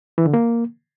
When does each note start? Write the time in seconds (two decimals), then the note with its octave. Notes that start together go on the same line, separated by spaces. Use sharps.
0.18 E3
0.26 D3
0.34 A#3